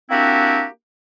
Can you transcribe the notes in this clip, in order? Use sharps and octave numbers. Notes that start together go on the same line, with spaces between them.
A#3 C4 D4 E4 F#4 G4